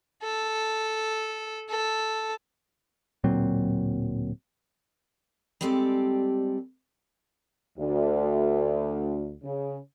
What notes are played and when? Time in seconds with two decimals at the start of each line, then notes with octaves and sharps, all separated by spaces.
0.23 A4
1.70 A4
3.24 D1 A#2 F#3 C4
5.61 G3 G#3 C4 G4 A4 D5
7.78 D2
9.44 C#3